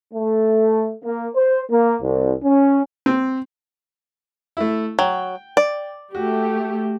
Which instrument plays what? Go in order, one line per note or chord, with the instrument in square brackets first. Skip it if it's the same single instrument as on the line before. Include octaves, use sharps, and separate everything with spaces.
[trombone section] A3
A#3
C5
A#3
C2
C#4
[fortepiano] C4
A3 E4
[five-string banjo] F#3 [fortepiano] G5
[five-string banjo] D5
[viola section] A3 G4 [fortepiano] F#4